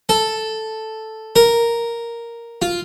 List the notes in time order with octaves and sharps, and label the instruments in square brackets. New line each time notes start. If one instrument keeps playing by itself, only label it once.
[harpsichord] A4
A#4
F4